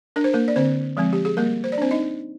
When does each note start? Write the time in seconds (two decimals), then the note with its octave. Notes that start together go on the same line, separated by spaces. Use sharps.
0.16 D4 A#4
0.24 C5
0.34 A#3 A#4
0.48 D5
0.56 D3 C4 C5
0.97 F3 G#3 C4
1.13 G4
1.25 G#4
1.37 G3 A#3 A#4
1.64 C5
1.72 D5
1.78 C4 D4 C5
1.91 D#4 D#5